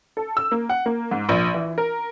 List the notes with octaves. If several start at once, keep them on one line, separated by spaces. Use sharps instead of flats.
A4
E6
A#3
F#5
A#3
G#2
A#1
E3
A#4